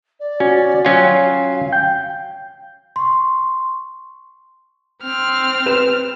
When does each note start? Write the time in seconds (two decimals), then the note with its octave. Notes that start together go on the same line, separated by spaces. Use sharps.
0.20 D5
0.40 C#4 F#4
0.85 F#3 C#4 F4 G5
1.04 F5
1.73 G5 G6
2.96 C6 C#6
5.02 C4 F6
5.66 B4 E7